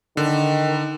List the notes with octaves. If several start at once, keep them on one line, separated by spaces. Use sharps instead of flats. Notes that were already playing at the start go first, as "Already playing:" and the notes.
D3 D#3